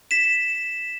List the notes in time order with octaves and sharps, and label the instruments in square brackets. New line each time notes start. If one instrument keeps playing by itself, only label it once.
[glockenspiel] B6 E7